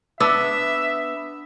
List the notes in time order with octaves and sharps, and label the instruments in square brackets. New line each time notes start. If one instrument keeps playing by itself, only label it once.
[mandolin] B3 E6 [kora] D4 [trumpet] E5